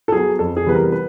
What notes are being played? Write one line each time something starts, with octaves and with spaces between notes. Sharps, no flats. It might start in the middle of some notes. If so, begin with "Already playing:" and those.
A4
F#3 B3 G#4
F2 A4
G#4
C3 E3 G3 B3 B4
A#4
B4